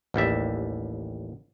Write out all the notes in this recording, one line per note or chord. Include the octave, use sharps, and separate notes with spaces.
A1 D#2 G3 E5